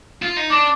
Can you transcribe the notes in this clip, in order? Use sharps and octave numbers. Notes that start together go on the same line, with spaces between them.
F4
D#4
D4 D6